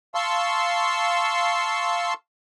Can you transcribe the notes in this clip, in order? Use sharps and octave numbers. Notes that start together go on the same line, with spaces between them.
F5 A5 C6 C#6 E6